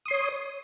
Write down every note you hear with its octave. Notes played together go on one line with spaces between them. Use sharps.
C#5 C6 D#6